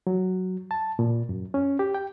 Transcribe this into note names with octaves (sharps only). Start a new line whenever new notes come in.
F#3
A5
A#2
F#2
C#4
G4
G5